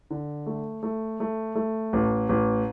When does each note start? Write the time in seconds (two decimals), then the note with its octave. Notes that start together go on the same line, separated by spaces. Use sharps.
0.10 D3
0.46 A3
0.83 A3
1.20 A3
1.55 A3
1.93 A1
2.29 A1